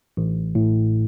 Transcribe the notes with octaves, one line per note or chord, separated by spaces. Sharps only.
A1
A2